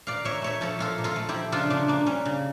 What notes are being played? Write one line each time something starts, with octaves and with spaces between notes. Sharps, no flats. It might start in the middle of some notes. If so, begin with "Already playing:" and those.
A#2 D5 F5
A#2 C#5 E5
A3 C#5 E5
F3 A4 C#5
A#2 F4 A4
A#2
F4 A4
A3
E4 G4
F3
C#3 D4 F4
C#3 D4
A#3 D4
G3 C#4
C#3